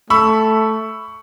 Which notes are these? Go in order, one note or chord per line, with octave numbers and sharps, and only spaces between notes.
A3 B5 C#6 E6